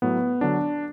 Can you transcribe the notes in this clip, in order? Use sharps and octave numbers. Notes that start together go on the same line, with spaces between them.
A2 F#3 B3
D3 F#3 D4